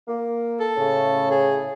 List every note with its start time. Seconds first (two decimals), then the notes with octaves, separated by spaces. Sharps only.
0.08 A#3
0.60 A4
0.77 A2 C#3
1.31 G#4